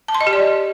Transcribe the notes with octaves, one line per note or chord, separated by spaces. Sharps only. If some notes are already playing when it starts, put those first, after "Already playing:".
A5
C6
D#5
G4
D5